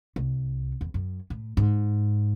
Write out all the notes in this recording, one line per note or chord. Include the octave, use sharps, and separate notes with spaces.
C2
E2
F#2
A2
G#2